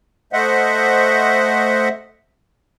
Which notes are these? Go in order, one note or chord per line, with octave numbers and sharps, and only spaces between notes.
A3 C5 D#5 E5 F#5